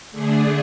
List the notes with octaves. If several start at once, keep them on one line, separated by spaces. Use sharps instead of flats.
D3 A3 D4 G#4